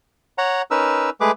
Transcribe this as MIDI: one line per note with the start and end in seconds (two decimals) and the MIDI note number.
0.38 0.62 73
0.38 0.62 78
0.38 0.62 82
0.71 1.10 61
0.71 1.10 63
0.71 1.10 70
0.71 1.10 71
0.71 1.10 88
1.21 1.31 56
1.21 1.31 57
1.21 1.31 68
1.21 1.31 71
1.21 1.31 86